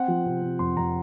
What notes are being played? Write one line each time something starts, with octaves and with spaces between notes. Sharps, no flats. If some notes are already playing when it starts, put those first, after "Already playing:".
Already playing: C4 F#5
F3
C3
C3
F2 C6
F2 A#5